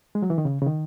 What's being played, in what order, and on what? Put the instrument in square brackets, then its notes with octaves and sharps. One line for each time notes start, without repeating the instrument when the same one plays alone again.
[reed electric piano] G#3
F#3
E3
D#3
C#3
C#3
D#3